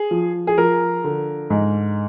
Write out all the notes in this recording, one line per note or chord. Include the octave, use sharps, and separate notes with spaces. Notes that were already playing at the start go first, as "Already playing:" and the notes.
Already playing: G#4
F3
G#4
F3 A#4
D3
G#2